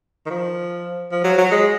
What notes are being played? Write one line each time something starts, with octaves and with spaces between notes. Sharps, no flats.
D#3
F3
F3
F#3
F#3
G#3